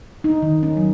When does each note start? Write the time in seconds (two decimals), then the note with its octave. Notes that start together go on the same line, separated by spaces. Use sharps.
0.24 D#4
0.42 D#3
0.63 C#4
0.77 F#3